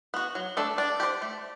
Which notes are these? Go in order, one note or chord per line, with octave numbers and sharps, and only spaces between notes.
B3 F#4
F#3
A3 D4 A4
D4 D5
G4 C5
A3